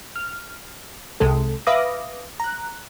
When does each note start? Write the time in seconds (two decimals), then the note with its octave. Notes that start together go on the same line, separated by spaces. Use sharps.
0.16 F6
1.20 C2 C3 G#3 A4
1.67 B4 E5 F5 D6 D#6 A#6
2.40 A#5 F#6